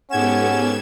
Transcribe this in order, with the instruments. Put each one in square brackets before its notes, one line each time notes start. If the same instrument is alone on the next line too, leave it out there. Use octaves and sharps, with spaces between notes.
[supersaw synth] G#2 G#6 E7 [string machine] B3 G4 A4 [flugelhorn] C#4 [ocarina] F#5